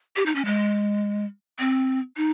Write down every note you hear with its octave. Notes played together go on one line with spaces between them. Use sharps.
G4
D#4
C#4
G#3
C4
D#4